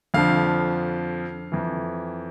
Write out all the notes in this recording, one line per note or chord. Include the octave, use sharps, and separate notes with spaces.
F2 D3 F3 F5
F2 E3